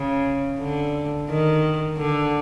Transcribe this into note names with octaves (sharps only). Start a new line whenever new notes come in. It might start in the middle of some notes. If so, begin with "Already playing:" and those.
Already playing: C#3
D3
D#3
D3